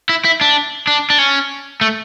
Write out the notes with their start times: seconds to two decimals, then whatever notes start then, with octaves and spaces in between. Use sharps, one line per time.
0.09 E4
0.25 E4
0.41 D4
0.87 D4
1.10 D4
1.18 C#4
1.81 A3